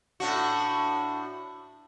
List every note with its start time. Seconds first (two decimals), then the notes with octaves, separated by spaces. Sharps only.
0.20 A2 D4 F#4